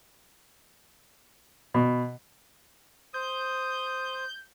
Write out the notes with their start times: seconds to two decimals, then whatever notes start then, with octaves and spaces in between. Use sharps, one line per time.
1.74 B2
3.14 C5 D#6 G6